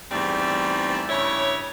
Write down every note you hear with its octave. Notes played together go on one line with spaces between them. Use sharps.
E2 G#2 G3 A3 C4
G2 C#3 E4 C#5